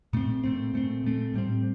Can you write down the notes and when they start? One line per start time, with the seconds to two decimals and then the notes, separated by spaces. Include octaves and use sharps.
0.13 A#2 A3 C4
0.44 A#2 A3 C4
0.74 A#2 A3 C4
1.04 A#2 A3 C4
1.34 A2 G3 C4